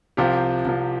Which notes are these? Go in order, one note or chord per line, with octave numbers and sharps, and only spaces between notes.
C2 C3 F3 F4 G4
C2 C3 F3